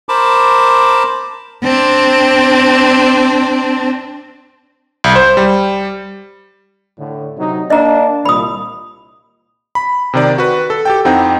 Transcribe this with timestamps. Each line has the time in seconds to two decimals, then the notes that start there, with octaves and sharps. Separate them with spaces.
0.09 A#4 C5 A5 B5 D6
1.63 C4 D4
5.04 C2
5.15 C5
5.37 G3
6.99 A2 D3
7.38 C3 F#3 D#4
7.70 A#3 D4 D#5 A#5
8.25 C2 A#2 B5 D#6
9.75 B5
10.13 C3 D#3 D5
10.38 F#4 B4
10.70 A4
10.85 G4 A4 G5
11.05 F2 C4 D#4 E4 F#5 G5